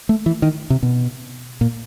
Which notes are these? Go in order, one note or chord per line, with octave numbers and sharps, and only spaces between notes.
A3
E3
D#3
C3
B2
A#2